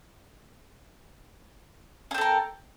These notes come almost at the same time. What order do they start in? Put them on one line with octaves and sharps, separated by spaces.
C#4 C4 A4 A#4